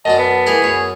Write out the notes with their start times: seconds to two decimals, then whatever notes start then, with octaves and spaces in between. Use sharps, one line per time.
0.05 F#2 B2 D4 D#5 A5
0.19 B3
0.47 E3 G#4 A#4 D#5
0.62 F#2 C#5